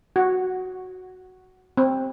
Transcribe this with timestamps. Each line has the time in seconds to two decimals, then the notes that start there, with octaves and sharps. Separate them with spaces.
0.16 F#4
1.77 C4